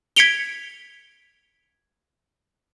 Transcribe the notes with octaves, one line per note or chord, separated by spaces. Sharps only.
G#6 B6 C#7 D7 F7 G7